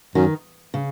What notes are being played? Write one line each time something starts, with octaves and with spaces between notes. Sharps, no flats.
F#2 D#3
C#3